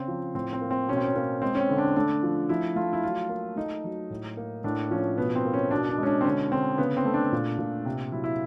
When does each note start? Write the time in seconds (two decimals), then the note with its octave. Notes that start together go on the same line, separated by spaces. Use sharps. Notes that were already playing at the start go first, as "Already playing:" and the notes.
Already playing: C#3 C4
0.08 F3
0.35 A2 C4
0.53 C4
0.61 A#3
0.71 C4
0.88 B2 C#4
0.97 C4
1.05 C#4
1.16 A#3 C#4
1.42 G#3 C4
1.55 C#4
1.60 C4
1.69 D3
1.78 D4
1.96 A3 D4
2.23 F3
2.49 F3 E4
2.76 A3 F4
2.93 E4
3.03 F#3 F4
3.29 A#3
3.56 A3 D#4
3.84 F#3
4.10 A2
4.37 A#3
4.64 A2 D4
4.91 F3 C#4
5.17 B2 B3
5.35 C4
5.45 A#3
5.53 C#4
5.71 B2 D4
5.89 D4
5.98 G#3 C#4
6.07 D4
6.21 C4
6.24 D3 C#4
6.51 D3 C4
6.78 C#3 B3
6.97 C4
7.05 A3
7.14 D4
7.32 A#2
7.58 A#2
7.85 C3
8.12 F#3 E4
8.24 E4